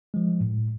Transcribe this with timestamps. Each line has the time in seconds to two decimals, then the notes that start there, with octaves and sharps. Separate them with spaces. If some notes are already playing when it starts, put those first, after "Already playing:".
0.14 F3 G#3
0.40 A2